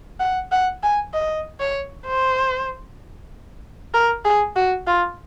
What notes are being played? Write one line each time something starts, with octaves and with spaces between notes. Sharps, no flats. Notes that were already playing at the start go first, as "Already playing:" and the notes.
F#5
F#5
G#5
D#5
C#5
C5
A#4
G#4
F#4
F4